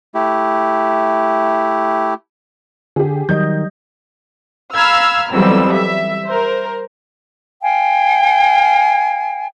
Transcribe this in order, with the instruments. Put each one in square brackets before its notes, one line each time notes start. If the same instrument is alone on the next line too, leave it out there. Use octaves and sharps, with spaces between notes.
[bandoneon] A3 E4 G4
[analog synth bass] D3 [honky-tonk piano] G4 G#4
[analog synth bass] D#3 [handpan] F#3 G3 D#5 [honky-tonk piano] G6
[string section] F5 A#5 B5 E6 F6 G#6
F2 E3 F#3 G3 B3 E6
E5
A#4 C5
[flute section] F5 G5 G#5